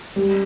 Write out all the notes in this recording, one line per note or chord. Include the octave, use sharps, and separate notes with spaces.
G3